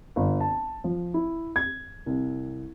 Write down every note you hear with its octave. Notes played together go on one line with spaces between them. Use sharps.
G1
A5
F3
E4
G#6
C2